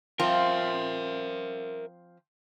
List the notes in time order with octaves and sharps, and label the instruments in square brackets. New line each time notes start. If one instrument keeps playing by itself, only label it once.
[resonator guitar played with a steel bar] F3 C4 F4 [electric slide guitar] A#4 E5